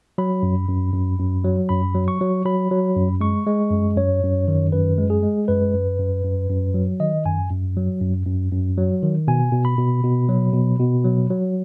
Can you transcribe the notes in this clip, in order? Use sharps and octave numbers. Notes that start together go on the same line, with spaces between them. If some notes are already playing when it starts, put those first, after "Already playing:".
F#3 B5
F#2
F#2
F#2
F#2
F#3
F#2 B5
F#3
C#6
F#3
F#3 B5
F#3
F#2
G#3 C#6
G#3
F#2
F#2 C#5
F#2
D#3
F#2 B4
G#3
G#4
G#3
F#2 B4
F#2
F#2
F#2
F#2
F#3
D#3 D#5
F#2 G#5
F#2
F#3
F#2
F#2
F#2
F#3
D#3
B2 G#5
B2
B5
B2
B2
F#3
B2
B2
F#3
F#3